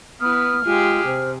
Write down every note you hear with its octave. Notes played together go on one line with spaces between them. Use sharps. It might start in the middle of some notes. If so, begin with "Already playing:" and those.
B3 E4 B4 D#6 F6
G#3 F4 G4 G#4
C3 C5